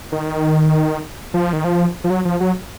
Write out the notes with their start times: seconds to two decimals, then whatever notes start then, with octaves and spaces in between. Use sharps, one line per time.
0.12 D#3
1.34 F3
1.53 D#3
1.64 F3
2.04 F3
2.10 F#3
2.25 F3
2.40 F#3